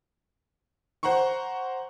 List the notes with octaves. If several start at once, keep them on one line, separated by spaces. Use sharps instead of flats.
C5 F#5 A#5 C6 C#6